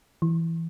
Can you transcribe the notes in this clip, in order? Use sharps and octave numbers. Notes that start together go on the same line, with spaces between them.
E3